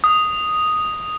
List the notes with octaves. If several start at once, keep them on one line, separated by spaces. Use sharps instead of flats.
D#6